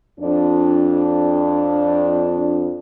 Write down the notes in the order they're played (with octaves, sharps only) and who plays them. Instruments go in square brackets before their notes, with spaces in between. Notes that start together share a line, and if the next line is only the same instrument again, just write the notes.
[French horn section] F2 D4